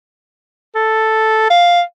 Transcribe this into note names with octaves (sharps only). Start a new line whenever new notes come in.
A4
F5